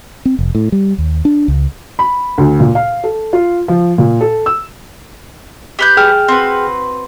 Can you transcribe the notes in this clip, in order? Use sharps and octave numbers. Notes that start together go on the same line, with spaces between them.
C4
F1
A2
G3
D#2
D4
C#2
B5
D2
A#2
F5
A4
F4
F3
A#2
A4
E6
G4 B4 G6
G#4 G5 F6
C4 F#4 B4